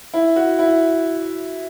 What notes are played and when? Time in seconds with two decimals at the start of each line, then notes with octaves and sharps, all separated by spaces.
0.14 E4
0.36 F#4
0.59 E4